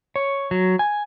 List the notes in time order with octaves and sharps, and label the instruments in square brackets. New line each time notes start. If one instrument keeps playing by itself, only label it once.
[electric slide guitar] C#5
F#3
G#5